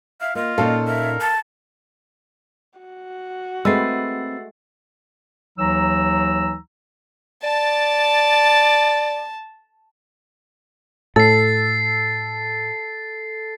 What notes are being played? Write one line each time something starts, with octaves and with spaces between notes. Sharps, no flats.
E5 F5
A#3 F4 D#5
A#2 C#4 D#4 A4 F5
A#4 E5
A5
F#4
G#3 A3 C4 B4 E6 A6 C7
D#2 E3 F#3 D#4 A#5 E6
D5 A5
A2 A4 A6 C7